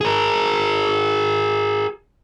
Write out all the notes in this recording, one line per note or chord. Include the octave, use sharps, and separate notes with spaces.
G#4 A#4